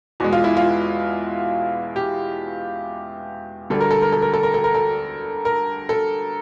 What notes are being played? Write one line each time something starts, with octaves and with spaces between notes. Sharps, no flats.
E2 B2 G#3 F#4
F4
E4
F4
G4
D2 D3 G3 A4
A#4
A4
A#4
A4
A#4
A4
A#4
A4
A#4
A4
A#4
A4